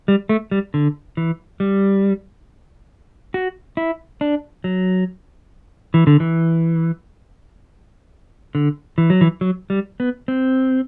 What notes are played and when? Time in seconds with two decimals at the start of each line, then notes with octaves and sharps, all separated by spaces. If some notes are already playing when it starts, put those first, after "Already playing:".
0.08 G3
0.29 A3
0.51 G3
0.74 D3
1.17 E3
1.60 G3
3.34 F#4
3.77 E4
4.21 D4
4.64 F#3
5.94 E3
6.07 D3
6.20 E3
8.55 D3
8.98 E3
9.10 F#3
9.21 E3
9.41 F#3
9.70 G3
10.00 B3
10.28 C4